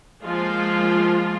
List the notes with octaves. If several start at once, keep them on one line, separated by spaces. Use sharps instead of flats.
F3 G#3 A#3 F4